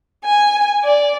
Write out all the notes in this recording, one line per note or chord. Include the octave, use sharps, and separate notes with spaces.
G#5
D5